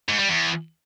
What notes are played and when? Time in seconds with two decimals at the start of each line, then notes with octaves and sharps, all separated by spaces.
0.08 G#2
0.18 G3
0.28 E2